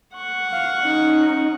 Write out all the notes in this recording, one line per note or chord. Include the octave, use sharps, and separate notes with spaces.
F#5 C#6
F5
C#4 D#4